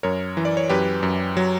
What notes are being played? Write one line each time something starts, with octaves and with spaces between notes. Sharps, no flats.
F#2 A#4 C#5
E3
D5
C#5
F#2 G4 B4
F#2
F#3